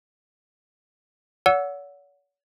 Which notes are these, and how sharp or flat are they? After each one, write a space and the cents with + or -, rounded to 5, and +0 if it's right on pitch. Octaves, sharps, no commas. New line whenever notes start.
C#5 +45 F#5 -15 E6 +0